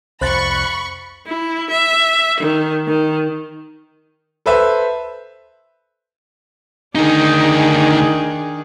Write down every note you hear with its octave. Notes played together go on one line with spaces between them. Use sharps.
C2 F2 C5 B5 C#6 F#6 A6
E4
E5
D#3
D#3
A4 B4 C5 E5
D2 D#3 D4 D#4 G#4